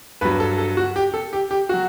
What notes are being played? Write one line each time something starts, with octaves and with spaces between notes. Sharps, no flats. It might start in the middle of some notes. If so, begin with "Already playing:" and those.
G2 F#3 B4
A4
A4
F#4
G4
A4
G4
G4
F#3 F#4